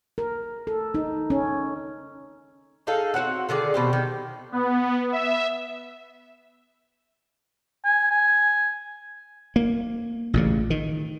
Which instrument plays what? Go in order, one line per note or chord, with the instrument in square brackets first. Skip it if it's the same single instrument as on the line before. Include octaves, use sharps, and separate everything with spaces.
[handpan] A#4
A4
D#4
C#4
[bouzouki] D#4 G#4 A4 F5
C4 F#4 C#5 F#5
D3 D#3 G#4 D5
B2 C4 G4
D#3
[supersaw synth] B3
E5
[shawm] G#5
G#5
[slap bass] A#3
A1 A#2 C#3
D#3